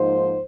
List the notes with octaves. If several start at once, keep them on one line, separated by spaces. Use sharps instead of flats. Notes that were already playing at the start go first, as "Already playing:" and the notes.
Already playing: G#2 F3 A#3 D#4 C5